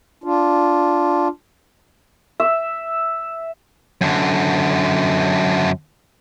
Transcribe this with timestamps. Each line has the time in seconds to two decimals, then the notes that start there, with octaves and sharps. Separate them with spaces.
0.24 D4 F4
2.40 E5
4.01 F#2 D3